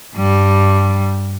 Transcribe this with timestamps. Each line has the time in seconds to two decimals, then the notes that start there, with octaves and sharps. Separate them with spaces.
0.15 G2 G3